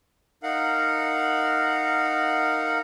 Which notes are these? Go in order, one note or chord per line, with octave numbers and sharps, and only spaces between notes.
D#4 A#4 F5 F#5